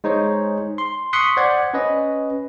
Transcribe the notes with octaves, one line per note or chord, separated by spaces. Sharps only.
G#3 D#4 C5 C#5
C6
C6 C#6 D#6 F#6 B6 C#7
C5 D5 F#5 G#6
C#4 B4 D#5